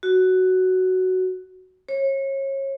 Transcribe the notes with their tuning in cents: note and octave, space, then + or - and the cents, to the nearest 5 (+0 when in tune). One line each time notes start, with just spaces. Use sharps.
F#4 +5
C#5 -30